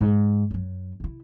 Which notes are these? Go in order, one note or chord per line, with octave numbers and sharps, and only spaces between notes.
G#2
F#2 F#3
C3 E4